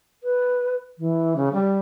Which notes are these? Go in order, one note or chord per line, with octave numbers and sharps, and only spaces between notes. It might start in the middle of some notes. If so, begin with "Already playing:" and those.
B4
E3
C#3
G3